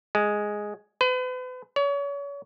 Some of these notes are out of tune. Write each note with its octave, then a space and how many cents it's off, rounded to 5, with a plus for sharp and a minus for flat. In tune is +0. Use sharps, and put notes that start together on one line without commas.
G#3 +0
B4 +40
C#5 +35